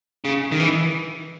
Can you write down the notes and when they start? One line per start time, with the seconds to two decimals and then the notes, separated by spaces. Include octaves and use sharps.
0.25 C#3
0.52 D#3
0.60 E3